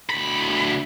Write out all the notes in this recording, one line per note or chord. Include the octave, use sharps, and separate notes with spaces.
D2 B5